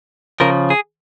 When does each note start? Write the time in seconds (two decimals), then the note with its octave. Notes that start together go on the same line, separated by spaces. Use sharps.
0.40 C#3 F3 A#4
0.70 G#4